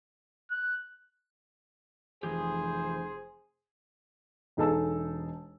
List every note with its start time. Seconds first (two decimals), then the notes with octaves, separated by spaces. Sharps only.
0.51 F#6
2.23 F1 E3 F3 G4 G#4 C5
4.57 E1 D#4 G#4 A4 A5 E6